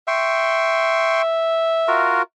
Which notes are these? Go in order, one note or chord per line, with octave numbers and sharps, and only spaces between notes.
E5 G5 C6 C#6
F4 F#4 A#4